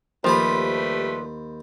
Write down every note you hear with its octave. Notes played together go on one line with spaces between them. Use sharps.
D#2 F3 G3 A3 B4 C5 B5